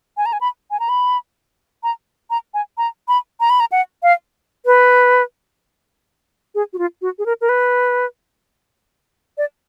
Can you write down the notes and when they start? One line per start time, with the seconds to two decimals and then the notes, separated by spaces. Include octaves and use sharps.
0.17 G#5
0.26 A#5
0.33 G#5
0.41 B5
0.71 G#5
0.80 A#5
0.89 B5
1.83 A#5
2.30 A#5
2.54 G#5
2.78 A#5
3.08 B5
3.40 A#5
3.50 B5
3.60 A#5
3.72 F#5
4.03 F5
4.66 B4
6.55 G#4
6.73 F#4
6.78 F4
7.02 F#4
7.19 G#4
7.26 A#4
7.41 A#4
7.49 B4
9.38 D5